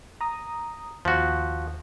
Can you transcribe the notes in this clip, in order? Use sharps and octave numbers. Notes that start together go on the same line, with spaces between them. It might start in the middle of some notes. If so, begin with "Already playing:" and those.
A#5 D#6
D#2 F3 F#4